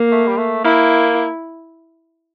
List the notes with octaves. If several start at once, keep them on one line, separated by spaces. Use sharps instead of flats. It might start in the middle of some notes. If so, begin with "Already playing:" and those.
Already playing: A#3
A3
G3
A3
A#3 E4